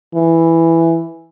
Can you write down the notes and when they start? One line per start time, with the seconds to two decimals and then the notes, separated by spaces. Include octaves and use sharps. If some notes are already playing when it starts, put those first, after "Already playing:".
0.14 E3